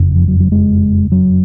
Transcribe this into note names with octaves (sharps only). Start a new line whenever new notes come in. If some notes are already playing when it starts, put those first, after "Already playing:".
Already playing: F#1 F2 C#3
F3
F#3
F#3
G#3
F#3